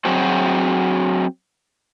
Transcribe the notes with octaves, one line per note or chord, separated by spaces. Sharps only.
F#3 C4 F#4 G#4 C5